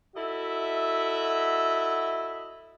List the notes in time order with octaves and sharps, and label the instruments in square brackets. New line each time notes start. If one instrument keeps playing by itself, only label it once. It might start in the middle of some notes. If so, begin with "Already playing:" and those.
[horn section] E4 F#4 A4 D#5 E5